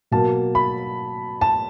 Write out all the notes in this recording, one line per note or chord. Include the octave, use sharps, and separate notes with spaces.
B2 F#3 A#3 A5
B5
A5